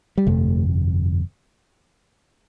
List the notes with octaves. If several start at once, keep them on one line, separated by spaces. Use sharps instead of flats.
G3
G1 F2 C3 A3